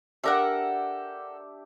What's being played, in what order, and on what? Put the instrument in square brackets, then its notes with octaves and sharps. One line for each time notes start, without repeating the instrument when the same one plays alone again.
[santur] D4 G4 E5 [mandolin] A4 A#4 F#5